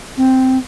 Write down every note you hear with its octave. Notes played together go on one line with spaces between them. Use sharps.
C4